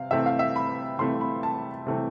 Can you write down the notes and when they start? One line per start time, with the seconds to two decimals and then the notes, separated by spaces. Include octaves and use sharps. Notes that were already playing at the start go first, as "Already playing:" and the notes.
Already playing: C3 C4 F5
0.11 C3 E3 A3 C4 E5
0.26 F5
0.39 E5
0.56 B5
0.99 C3 E3 A3 C4 C6
1.21 B5
1.43 A5
1.87 C3 E3 A3 C4